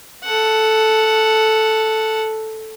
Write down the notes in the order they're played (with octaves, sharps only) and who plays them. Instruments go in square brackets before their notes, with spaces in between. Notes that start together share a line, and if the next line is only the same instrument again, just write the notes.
[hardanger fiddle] A4 F#5